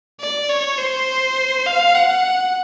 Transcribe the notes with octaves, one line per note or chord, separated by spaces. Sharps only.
D5
C#5
C5
F5
F#5